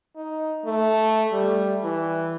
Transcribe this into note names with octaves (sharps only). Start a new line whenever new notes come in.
D#4
A3
G3
E3